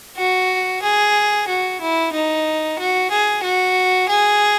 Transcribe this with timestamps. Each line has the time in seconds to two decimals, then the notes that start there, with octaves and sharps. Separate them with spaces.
0.17 F#4
0.82 G#4
1.48 F#4
1.81 E4
2.13 D#4
2.79 F#4
3.11 G#4
3.43 F#4
4.09 G#4